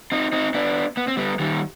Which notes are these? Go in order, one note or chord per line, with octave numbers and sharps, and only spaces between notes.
C4 D#4
C4 D#4
B3 D4
B3
C4
G3 B3
D#3 G3